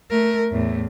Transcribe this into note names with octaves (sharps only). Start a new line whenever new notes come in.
A3 A#4
E2 A2